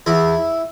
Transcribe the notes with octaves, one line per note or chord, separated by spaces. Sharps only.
E2 E4